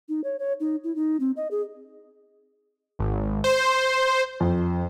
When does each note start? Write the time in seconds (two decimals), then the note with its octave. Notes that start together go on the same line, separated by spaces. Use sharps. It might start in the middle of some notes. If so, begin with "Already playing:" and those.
0.09 D#4
0.24 C#5
0.39 C#5
0.60 D#4
0.84 E4
0.96 D#4
1.20 C4
1.37 D#5
1.51 G#4
2.99 G#1
3.44 C5
4.40 F2